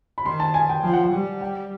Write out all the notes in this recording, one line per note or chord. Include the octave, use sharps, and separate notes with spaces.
B5
D#3 C6
A5
G#5
G5
F3 G5
F#5
G5
G3
G5